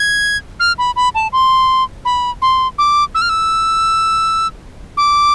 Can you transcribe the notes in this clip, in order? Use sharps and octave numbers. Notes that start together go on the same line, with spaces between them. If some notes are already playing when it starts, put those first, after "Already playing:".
Already playing: G#6
F6
B5
B5
A5
C6
B5
C6
D6
E6
F6
E6
D6